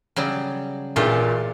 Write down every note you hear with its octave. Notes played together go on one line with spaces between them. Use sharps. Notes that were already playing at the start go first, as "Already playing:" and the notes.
C#3 F#3 G3
A1 A#2 D4 F4 G4 G#4